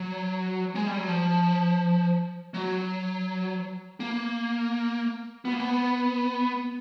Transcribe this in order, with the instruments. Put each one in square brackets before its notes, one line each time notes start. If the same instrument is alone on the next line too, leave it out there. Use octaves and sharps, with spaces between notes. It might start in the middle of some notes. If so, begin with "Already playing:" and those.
Already playing: [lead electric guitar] F#3
G#3
G3
F#3
F3
F#3
A#3
B3
A#3
B3